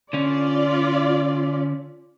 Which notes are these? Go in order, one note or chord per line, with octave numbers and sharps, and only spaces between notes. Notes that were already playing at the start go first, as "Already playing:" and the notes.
D3 C#4 F4 D5